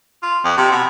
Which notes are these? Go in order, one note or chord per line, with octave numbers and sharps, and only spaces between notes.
F4
F2
C3
B2